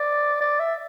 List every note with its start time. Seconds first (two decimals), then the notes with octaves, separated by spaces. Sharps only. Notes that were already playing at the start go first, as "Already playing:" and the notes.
Already playing: D5
0.41 D5
0.59 E5